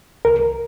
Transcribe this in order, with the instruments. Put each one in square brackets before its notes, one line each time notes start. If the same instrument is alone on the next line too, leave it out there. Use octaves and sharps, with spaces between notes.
[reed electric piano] C2 A#4